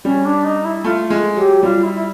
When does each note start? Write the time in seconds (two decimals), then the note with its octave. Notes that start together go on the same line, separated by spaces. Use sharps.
0.04 G3 C#4
0.24 D4
0.44 D#4
0.64 E4
0.84 A3 F4
1.10 G#3
1.37 F#3 G4
1.63 G3 F4
1.83 E4
1.93 E4